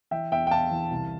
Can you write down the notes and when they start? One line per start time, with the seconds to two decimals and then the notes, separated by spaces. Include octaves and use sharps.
0.11 E3 E5 G5
0.31 E2 E5 G5
0.47 G5
0.51 E2 F5 A5
0.71 E3
0.91 C2